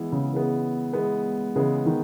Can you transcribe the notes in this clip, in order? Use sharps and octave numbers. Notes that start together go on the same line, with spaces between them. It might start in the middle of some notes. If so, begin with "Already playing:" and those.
Already playing: E3 G#3 B3
C#3
E3 G#3 B3
E3 G#3 B3
C#3 E3 G#3 B3
D#3